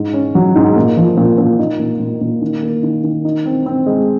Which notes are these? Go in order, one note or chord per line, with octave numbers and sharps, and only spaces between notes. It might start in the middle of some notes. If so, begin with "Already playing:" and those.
Already playing: G#2
C#4
F#3
G#2
A#2
F3
A#2
A#2
D#4
A#2
A#2
A#2
D#3
A#3
D#3
D#3
D#4
C4
C4
G#3